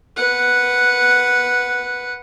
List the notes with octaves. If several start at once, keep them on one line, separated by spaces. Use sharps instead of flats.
B4 F#5